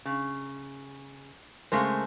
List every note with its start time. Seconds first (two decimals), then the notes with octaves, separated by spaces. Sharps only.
0.05 C#3
1.72 C#3 G#3 A3 A#4 C5